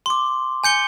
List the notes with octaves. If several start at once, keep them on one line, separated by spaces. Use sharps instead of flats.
C6 D6
G#5 G6 C#7 G7